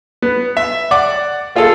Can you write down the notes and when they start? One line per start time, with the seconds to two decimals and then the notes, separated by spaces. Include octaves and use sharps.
0.22 B3
0.57 E5
0.91 D5 F#5 D6
1.56 A#3 F4 G#4 A4